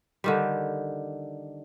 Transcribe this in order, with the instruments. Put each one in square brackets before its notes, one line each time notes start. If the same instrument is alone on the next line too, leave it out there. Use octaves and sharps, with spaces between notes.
[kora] D3 D#3 G3